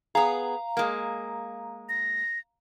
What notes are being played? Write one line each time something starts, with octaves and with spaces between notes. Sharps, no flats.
B3 G#4 F5 A#5
G#3 A#3
A#6